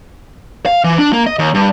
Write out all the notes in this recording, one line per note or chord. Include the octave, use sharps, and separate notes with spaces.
F5
E3
D4
A#3
D#5
D#2
G2